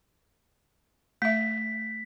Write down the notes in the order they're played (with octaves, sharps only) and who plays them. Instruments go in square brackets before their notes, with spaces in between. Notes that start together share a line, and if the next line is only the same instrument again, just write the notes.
[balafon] A3 E5 [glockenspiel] B6